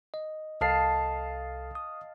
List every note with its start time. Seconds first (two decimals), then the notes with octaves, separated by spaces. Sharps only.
0.14 D#5
0.61 C2 A4 D#5 F5 A5 C7
1.75 D#6